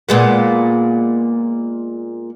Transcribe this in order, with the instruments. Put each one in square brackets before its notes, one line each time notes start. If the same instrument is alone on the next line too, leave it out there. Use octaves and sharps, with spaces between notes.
[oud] A#2 G#3 B3